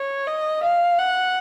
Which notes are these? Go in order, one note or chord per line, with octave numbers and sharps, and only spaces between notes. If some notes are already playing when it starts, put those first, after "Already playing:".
Already playing: C#5
D#5
F5
F#5